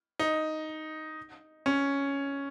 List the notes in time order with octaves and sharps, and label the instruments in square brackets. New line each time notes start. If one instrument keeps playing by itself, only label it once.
[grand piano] D#4
C#4